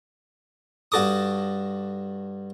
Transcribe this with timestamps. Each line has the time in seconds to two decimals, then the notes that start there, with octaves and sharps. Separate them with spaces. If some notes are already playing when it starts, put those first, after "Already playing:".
0.92 G2 F#4 A4 D6 D#6